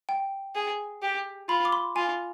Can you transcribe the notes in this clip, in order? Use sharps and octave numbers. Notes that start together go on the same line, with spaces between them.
G5
G#4
G4
F4 B5
D6
C6
F4 G#5